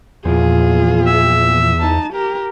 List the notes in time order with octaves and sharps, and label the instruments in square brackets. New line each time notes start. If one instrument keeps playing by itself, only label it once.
[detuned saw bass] E2 [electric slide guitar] A#2 F3 [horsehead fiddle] F4 G#4
[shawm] E5
[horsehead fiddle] D#4 A5
G4 A#4